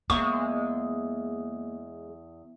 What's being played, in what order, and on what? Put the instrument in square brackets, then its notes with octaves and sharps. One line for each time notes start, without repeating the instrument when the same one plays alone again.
[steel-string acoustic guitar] E2 [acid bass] G#3 [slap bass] A#3 B3 [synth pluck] C#6